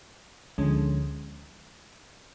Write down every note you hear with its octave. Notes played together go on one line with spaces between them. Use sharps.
D2 D3 F3 G#3 C#4